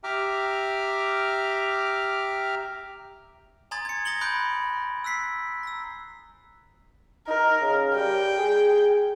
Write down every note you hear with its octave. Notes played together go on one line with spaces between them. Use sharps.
G4 E5 G5 A#5 D6 F6
G#5 A#5 C6 D#6 G#6 A6
G#6 C#7
D#6 G#6 A#6 C#7 F#7 G7
B5 C6 D#6 F#6 G6 D7
E6 F#6 B6 C7
A#5 E6
D#4 A#4
C#3
G3 G5
G#4